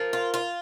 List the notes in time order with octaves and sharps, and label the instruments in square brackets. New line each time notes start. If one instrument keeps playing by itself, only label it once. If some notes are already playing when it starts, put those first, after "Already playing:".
Already playing: [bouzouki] F3 [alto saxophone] A#4
[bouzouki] F4
F4